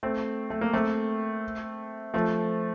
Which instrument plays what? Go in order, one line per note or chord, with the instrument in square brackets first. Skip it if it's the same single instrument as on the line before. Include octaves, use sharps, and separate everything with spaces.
[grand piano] A3 C4
A3
A#3
A3 C4
F3 A3